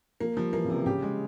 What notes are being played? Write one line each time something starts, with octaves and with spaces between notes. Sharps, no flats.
F3 A#3
F3 G3
E3 A#3
C#3
C3
E3
C#3 G4
G#3